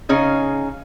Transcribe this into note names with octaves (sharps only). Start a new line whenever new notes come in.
C#3 C#4 D#4 G#4